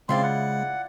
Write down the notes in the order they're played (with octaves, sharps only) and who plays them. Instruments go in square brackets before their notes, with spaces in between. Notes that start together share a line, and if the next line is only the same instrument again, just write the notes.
[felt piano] C#3 [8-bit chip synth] G#3 [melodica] C4 C6 [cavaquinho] E4 F4 D5
[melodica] F#5